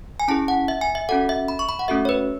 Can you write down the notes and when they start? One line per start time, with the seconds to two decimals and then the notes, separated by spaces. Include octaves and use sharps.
0.20 G#5
0.28 C#4 E4 G#4 A5
0.48 F#5
0.68 E5
0.81 G#5
0.95 E5
1.09 C#4 F#4 A4 F#5
1.29 E5
1.48 B5
1.59 C#6
1.69 B5
1.79 F#5
1.88 A3 C#4 F#4 A4 E5
2.05 C#5
2.09 B4